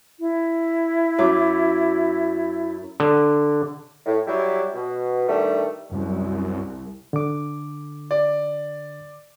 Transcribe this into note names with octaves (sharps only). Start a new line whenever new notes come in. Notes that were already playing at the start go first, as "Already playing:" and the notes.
E4
F#2 D6
D3
A2
F#3 G3 E4
B2
G2 D#3 G3 A3
C2 F#2
D3 D6
D5